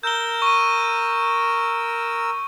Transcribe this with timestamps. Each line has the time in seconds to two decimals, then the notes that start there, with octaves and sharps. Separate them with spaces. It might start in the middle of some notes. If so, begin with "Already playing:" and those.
0.03 A#4 E6 G6 G7
0.42 C#6 D#7